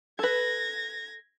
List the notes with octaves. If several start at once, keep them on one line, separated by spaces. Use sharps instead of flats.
A4 B4 G#6 A#6